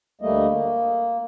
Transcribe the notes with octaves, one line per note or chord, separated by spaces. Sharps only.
D2 G3 A3 A#3 D#5
A#3